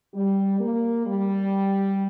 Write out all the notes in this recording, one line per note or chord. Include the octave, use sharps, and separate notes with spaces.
G3
A#3
G3